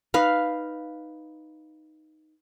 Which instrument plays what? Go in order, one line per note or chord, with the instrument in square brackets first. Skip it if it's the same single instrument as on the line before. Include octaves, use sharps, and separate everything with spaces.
[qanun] D#4 B4 F5